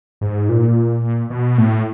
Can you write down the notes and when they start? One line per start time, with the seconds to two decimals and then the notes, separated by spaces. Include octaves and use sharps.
0.21 G#2
0.49 A#2
1.30 B2
1.58 A2